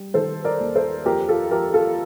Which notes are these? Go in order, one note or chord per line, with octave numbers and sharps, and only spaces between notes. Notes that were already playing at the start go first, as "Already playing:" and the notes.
Already playing: G3
D#3 A4 C5
A#4 D5
D#2
A4 C5
F2 G4 A#4
F4 A4
F3 G4 A#4
F4 A4